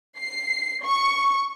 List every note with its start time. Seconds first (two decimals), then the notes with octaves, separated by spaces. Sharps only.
0.19 C7
0.84 C#6